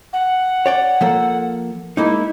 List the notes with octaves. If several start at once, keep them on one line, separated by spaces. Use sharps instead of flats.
F#5
C#5 D5 G5
F3 A#3 A4
G#3 A#3 D#4 E4